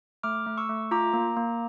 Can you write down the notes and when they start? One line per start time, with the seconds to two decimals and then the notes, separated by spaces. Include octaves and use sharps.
0.23 A3 D6 F6
0.46 A3
0.57 C#6 E6
0.69 A3
0.91 F4 A#5 D6
1.13 A#3
1.37 A#3